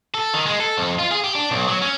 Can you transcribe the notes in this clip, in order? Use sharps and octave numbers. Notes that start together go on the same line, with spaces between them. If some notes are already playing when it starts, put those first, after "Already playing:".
A4
D#3
G#3
A4
F2
F4
G#4
G4
D4
B1
F#3
C#4